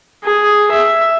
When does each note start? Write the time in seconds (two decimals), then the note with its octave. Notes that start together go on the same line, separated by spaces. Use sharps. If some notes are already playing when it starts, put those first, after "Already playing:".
0.24 G#4
0.72 E5